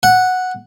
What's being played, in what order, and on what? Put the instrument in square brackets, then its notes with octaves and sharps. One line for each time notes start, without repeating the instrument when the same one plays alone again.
[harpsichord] F#5